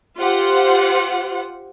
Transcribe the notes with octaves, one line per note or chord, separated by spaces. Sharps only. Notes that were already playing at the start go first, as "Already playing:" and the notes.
F4 G4 C5 F#5